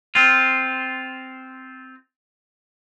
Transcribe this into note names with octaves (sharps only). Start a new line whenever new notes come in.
C4 F4